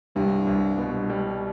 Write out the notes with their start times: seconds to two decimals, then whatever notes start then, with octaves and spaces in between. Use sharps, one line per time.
0.16 C2 G2
0.47 C2
0.78 B2
1.10 G3